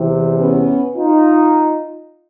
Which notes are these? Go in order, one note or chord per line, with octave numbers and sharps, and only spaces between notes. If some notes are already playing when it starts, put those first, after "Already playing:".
Already playing: E2 C3 E3
B3 C#4
D#4 F4